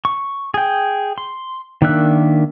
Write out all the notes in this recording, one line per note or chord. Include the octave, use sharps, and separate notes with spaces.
C#6
G#4 G5
C6
D#3 A#3 D4 E5 F#6